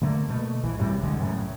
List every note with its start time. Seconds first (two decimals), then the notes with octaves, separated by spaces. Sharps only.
0.02 D3 A3 A#3
0.29 B2 A3
0.63 A#1 E3
0.78 F#2 A2 C3 G3
1.03 B1 D3 G#3
1.18 F#2 A2 C#3